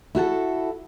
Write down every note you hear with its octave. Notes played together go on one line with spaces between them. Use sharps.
E4 F#4 G4 A4